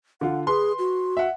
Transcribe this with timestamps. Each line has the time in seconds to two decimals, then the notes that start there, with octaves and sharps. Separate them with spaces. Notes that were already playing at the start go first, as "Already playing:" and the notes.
0.21 D3 F4 F#5
0.47 G#4 B4 C6
0.79 F#4
1.17 E5 F#5